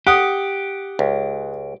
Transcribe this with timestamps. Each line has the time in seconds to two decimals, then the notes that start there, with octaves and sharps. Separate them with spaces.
0.07 G4 F#5 D#6
0.99 C#2